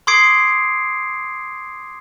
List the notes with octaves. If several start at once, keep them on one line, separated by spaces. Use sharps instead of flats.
C6 D6 D#6 G#6 C7 D7